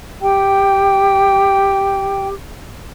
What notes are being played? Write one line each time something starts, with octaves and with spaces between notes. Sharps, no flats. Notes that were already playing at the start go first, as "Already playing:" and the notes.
G4 G5